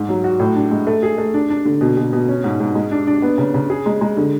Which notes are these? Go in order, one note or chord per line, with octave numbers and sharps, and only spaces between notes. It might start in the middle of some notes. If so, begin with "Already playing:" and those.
Already playing: G#2
F#3
F#4
A2
D4
G#3
A3
G#4
A3
D4
D4
D3
B2
B2
B2
C#4
G#2
G#2
G#3
D4
D4
B3
C#3
C#3
G#4
G#3
G#3
D3